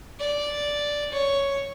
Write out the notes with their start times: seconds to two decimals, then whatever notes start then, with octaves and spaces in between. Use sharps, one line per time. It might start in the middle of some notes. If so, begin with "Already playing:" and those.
0.20 D5
1.12 C#5